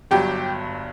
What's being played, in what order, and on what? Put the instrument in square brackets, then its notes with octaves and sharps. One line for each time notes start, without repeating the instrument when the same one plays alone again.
[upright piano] G1 G2 F#3 G4 G5